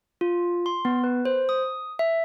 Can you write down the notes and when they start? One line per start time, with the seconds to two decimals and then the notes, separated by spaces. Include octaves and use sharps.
0.21 F4
0.66 C6
0.85 B3
1.04 B4
1.25 C5
1.49 D#6
1.99 E5